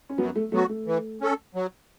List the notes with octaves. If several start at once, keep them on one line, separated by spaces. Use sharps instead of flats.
C#4
F#2 F#3 B3
A3
F#3 A3 B3 F#4
A3
E3
C#4 A4
F#3